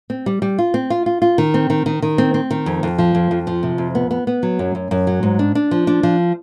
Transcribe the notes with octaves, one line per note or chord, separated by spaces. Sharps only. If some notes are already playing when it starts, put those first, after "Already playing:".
C4
G3
G3
F4
C4
F4
F4
F4
D#3
C4
D#3
D#3
D#3
C4
C4
D#3
F2
F2
F3
F2
F2
F3
C3
F2
B3
B3
B3
F#3
F#2
F#2
F#2
F#3
G#2
D4
D4
F3
D4
F3